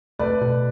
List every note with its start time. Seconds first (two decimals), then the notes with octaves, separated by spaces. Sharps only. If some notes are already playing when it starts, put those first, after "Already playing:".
0.19 A3 B4 D5
0.41 B2